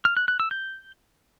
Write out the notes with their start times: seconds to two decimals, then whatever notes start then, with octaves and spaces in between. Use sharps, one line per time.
0.05 F6
0.17 F#6
0.28 F#6
0.40 E6
0.51 G6